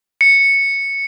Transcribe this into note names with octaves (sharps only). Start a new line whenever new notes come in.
C#7